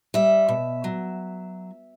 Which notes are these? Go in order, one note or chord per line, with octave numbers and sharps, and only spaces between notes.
G3 E5
B2
F#3